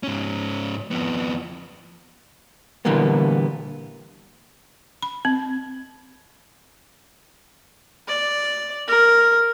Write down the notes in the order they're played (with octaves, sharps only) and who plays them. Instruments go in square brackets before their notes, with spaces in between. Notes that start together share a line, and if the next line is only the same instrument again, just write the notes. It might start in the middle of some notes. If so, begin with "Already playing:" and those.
[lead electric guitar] G#2 C#4
F2 B3
[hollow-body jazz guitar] A#2 D3 E3 G3 A#3 B3
[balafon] B5
C4
[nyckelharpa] D5
A#4